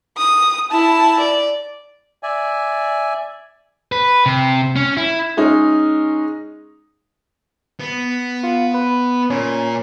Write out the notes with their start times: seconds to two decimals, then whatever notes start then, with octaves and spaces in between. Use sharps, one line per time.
0.17 D#6
0.71 E4 A5
1.19 D5
2.23 D5 E5 G#5
3.92 B4
4.26 C3
4.76 C#4
4.97 E4
5.37 G#3 C#4 D#4
7.79 B3
8.43 F4
8.74 B4
9.30 A#2 C#4